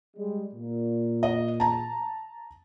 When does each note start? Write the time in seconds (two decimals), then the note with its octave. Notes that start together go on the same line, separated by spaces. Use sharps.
0.17 G3 G#3
0.54 A#2
1.23 D#5
1.60 A5 A#5